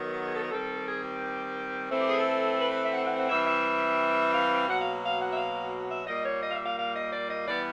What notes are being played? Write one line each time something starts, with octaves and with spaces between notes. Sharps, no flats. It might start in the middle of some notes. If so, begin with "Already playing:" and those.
Already playing: D#3 F#3 B3
G#4
A4
A#4
D#3 G3 C4 A4
G#4
G4
E3 A3 C4
G4
G#4
A4
B4
B4
E5
F#5
F#5
F#5
E3 G3 C4 E5
E5
F5
B2 F#3 A#3 F#5
F5
F5
F#5
E5
F5
E5
A#2 G3 A#3 D#5
C#5
D#5
F5
E5
F5
F5
D#5
D5
D#5
E3 G3 B3 D5